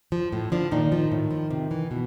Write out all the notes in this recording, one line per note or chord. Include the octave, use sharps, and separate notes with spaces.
F3
A2
D3 F3 D4
A#2 D#3 D#4
F3
A2
F3
C3
E3
B2